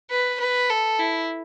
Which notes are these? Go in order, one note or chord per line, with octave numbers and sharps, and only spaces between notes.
B4
B4
A4
E4